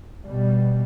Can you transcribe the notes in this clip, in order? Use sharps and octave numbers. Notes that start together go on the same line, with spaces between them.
B2 G3